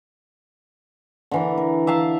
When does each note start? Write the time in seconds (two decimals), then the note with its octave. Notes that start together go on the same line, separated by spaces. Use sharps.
1.31 D3 E3 A#4
1.57 A#4
1.87 E5 F5 A5 A#5